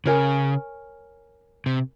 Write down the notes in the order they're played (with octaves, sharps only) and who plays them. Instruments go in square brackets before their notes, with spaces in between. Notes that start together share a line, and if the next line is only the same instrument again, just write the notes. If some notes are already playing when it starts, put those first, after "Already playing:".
[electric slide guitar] C#3 [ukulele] A#4 C#5 G#5
[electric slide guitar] C3